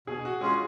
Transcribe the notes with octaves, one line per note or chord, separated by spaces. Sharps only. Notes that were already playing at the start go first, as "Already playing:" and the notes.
B2 G#4
F#4
G#3 C#4 F4 G#4